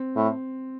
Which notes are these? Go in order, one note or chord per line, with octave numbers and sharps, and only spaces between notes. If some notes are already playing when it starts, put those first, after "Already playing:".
Already playing: C4
A2